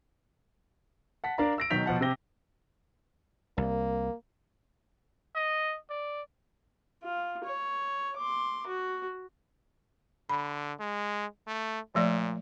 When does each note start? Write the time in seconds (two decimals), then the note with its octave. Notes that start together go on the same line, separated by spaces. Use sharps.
1.24 F#5 A5 B6
1.38 D4 A#4 D5 F5 A#5
1.58 E6 A#6 D7
1.70 B2 D#3 F#3 G6 B6 F7
1.86 B2 F3 F#5 A5
2.01 C3 C4 G4 A#6 G7
3.58 C2 A#3
5.36 D#5
5.90 D5
7.04 F4
7.44 C#5
8.16 C6 D6
8.67 F#4
10.29 D3 B5
10.80 G#3
11.47 A3
11.95 A#2 F3 A3 D5